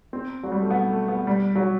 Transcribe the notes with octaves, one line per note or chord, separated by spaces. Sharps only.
C4
F#3
G3
A3
B3
A3
B3
G3
F#3